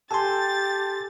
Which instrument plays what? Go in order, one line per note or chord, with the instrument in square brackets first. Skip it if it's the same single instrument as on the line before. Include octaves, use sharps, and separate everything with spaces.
[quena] G4 [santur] A4 G#5 [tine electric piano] A5 C6 [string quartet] A6